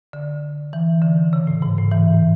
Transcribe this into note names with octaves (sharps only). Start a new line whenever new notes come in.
D3
E3
D3
C#3
A2
G#2
A2
E3